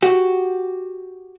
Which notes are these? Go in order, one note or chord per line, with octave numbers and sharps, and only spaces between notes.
F#4 G4